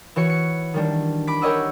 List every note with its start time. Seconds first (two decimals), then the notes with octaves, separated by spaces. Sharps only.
0.16 E3 F#4 C#5 C#7
0.30 C#7
0.74 D#3 G3 D4
1.27 B5 D6 B6
1.42 G4 A#4 C#5 D#5 F#5 E6